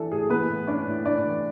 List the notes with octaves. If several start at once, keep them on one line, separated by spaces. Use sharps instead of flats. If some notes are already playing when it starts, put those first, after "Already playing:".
Already playing: E3 D4 A4
A2 G#4
E3 B3 B4
A2
C#4 D4 D5
A2
A2 D4 D5
E3